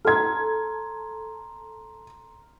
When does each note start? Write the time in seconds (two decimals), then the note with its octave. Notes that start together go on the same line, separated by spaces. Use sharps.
0.05 A4 A#5 C6 F6 G#6